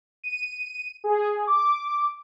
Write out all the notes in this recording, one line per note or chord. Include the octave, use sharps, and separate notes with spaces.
D#7
G#4
D6